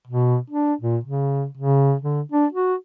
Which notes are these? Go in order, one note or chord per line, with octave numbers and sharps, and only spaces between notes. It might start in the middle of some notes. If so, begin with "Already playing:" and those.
B2
D4
A#2
C#3
C#3
D3
D4
F#4